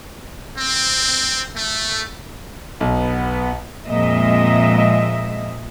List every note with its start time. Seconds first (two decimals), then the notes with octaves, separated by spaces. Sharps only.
0.58 C4
1.56 A3
2.80 B1 B3
3.86 F2 A#2 G#3 C4 D#5 E5